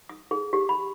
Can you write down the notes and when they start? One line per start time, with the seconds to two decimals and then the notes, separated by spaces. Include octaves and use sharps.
0.09 D#6
0.31 G#4
0.53 G4
0.69 B5